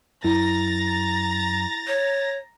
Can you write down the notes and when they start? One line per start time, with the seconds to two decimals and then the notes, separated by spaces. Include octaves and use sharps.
0.24 F#2 E4 A#5 A6 A#6
1.88 C#5